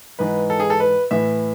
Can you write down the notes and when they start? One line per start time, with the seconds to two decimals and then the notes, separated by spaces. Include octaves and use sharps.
0.19 G#2 E3 B4
0.50 A4
0.60 G#4
0.70 A4
0.80 B4
1.11 A2 E3 E5